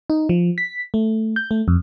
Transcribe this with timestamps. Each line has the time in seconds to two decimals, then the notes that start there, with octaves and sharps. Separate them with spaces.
0.10 D#4
0.29 F3
0.58 B6
0.94 A3
1.36 G6
1.51 A3
1.68 F2